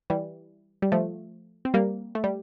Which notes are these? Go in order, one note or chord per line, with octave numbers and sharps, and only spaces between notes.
E3 G3
G3
F3 A3
C4
G3 A#3
A3
G3